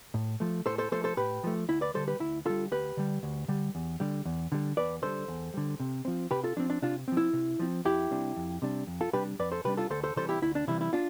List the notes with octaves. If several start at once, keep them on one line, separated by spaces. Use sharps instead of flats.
A2
F3 A3
A2 A4 C5
A4 C5
F3 A3 A4 C5
A4 C5
A2 G4 B4
F3 A3
D2 E4
B4 D5
D3 G3 A4 C5
G4 B4
D2 E4
D3 G3 F4 A4
D2 G4 B4
D3 G3
D2
D3 G3
E2
D3 G3
E2
D3 G3
E2 B4 D5
D3 G3 A4 C5
E2
D3 G3
C3
F3 C4
C3 G4 B4
F4 A4
F3 C4 D4
D4
C3 D4 F4
F3 C4
E4
C3
F3 C4
F2 E4 G4
C3 G3 D4
F2
C3 G3 D4
F2
F4 A4
C3 G3 D4 G4 B4
F2 B4 D5
A4 C5
C3 G3 D4 G4 B4
F4 A4
D2 A4 C5
A4 C5
C3 E3 G3 A4 C5
E4 G4
D2 E4
D4
C3 E3 G3 E4
E4
D4 F4